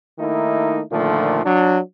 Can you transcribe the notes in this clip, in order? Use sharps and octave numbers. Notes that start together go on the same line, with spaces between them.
D#3 A3 A#3 D#4 E4
A#2 D3 D#3 F3 A3
F#3 D4